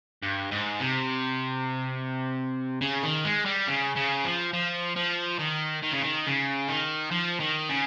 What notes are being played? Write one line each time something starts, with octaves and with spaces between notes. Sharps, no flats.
G2
G#2
C3
C#3
D#3
G#3
G3
C#3
C#3
F3
F3
F3
D#3
D#3
C#3
D#3
C#3
D#3
F3
D#3
C#3